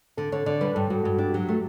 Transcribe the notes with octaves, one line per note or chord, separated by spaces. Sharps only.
D3 A4
D3 C#5
D3 D5
G3 B4
G2 A4
G2 F#4
G2 F#4
D4 G4
F#3 G4
A3
F#4